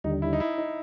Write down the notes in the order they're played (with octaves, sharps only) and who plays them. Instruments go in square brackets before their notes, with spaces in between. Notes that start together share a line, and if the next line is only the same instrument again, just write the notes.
[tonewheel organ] D#2 D3 G3 [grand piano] D#4
[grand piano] E4
D#4
E4
D#4